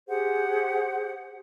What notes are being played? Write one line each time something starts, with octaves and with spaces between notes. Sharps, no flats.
G4 G#4 C5 F#5